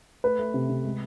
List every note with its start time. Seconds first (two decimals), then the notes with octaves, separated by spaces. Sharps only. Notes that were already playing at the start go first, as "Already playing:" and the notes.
0.24 A3 B4
0.39 A3
0.54 C3
0.69 C3
0.84 G#3